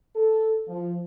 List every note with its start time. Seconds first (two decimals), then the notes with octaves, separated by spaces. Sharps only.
0.16 A4
0.68 F3